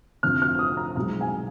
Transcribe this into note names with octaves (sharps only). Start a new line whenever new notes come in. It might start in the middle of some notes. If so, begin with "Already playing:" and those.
F1 F2 D3 F3 F6
F6
D#6
A#5
B1 B2 G#3 A#5
G#5